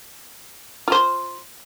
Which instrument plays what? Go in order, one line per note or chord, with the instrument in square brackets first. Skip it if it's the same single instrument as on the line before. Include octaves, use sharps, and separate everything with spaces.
[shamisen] F4 C5